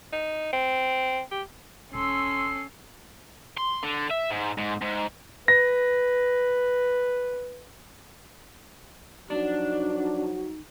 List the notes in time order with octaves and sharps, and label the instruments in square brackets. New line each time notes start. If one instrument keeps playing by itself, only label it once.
[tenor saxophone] D#4
C4
G4
[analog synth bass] E1 [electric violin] C#4 C7 [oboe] A4 [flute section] C6 E6
[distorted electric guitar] C6
D3
E5
G#2
G#2
G#2
[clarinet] B4 [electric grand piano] A#6
[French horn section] F3 F#3 F#4 [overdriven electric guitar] D4 [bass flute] D#4